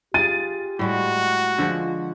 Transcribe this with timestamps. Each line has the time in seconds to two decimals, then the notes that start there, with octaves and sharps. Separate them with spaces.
0.14 F4 G4 G#4 A6 D#7
0.79 A2 G3 G#3 F#4
1.58 D3 F3 G#3 F4